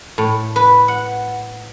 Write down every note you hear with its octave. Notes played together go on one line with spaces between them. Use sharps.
A2
B4
F#5